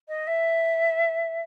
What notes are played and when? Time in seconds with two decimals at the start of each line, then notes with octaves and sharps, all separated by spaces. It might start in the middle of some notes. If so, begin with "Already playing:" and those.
0.08 D#5
0.27 E5